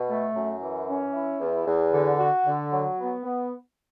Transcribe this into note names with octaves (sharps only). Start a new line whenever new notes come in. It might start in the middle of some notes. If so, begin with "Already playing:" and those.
Already playing: B2
A3
F#2
E3
C#4
E4
E2
E2
D3
F#4
D3
F#3
B3
B3